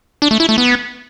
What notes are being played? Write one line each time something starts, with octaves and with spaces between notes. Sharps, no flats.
D4
A3
E4
A3
B3